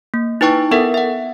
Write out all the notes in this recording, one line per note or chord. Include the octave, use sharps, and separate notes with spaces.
A#3
D#4 E4 B4 G5 A5 C#6
B3 A4 A#4 E5 F#5
E5 F#5